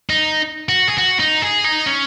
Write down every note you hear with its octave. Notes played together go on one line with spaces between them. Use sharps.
D#4
F#4
G#4
F#4
D#4
G#4
D#4
C#4